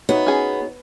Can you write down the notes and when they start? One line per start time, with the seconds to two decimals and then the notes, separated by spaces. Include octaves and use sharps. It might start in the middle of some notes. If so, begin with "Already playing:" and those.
0.09 B3 D#4 F#4 C#5
0.26 C#4 G#4